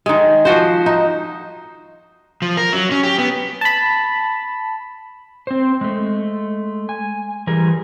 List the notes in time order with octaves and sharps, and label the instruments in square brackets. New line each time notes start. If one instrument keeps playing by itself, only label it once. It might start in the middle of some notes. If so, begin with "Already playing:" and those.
[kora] D#3 G#3
F3 F#4 C5
D#4
[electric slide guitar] F3
A#4
F#3
C#4
G4
B3
[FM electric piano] A5 B5
[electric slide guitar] C4 C5
G#3 A3
G#5
E3 G3 G#4 A#4